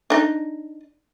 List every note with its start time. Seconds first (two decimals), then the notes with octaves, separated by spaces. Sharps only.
0.10 D4 D#4